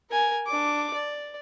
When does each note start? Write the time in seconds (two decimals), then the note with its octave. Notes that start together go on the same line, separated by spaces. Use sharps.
0.10 A#4 G#5
0.47 D4 D6
0.94 D5